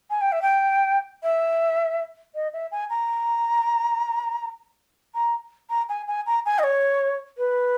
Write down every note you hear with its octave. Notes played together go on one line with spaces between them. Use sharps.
G#5
G5
E5
G5
E5
D#5
E5
G#5
A#5
A#5
A#5
G#5
G#5
A#5
G#5
D#5
C#5
B4